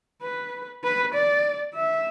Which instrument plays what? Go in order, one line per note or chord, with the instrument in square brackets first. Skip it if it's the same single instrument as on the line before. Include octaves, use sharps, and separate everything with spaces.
[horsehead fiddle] B4
B4
D5
E5